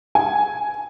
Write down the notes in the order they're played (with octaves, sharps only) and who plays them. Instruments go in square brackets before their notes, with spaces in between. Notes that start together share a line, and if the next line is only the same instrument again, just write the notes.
[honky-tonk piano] G#5